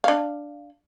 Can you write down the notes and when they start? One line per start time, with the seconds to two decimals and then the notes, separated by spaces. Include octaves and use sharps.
0.04 D4 F5